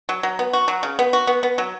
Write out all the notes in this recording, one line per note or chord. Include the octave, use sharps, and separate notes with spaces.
F#3
F#3
B3
F#4
F#3
C#3
B3
F#4
B3
B3
F#3